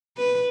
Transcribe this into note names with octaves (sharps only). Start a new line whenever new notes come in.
B4